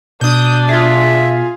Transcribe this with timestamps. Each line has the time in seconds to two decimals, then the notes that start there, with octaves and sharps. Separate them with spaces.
0.21 B2 D4 D#6 G6
0.69 F4 G#4 E5